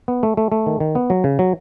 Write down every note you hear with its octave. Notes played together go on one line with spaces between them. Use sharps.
B3
A3
A3
A3
D#3
D#3
B3
F#3
C#3
F#3